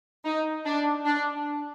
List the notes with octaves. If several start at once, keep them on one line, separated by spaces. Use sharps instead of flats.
D#4
D4
D4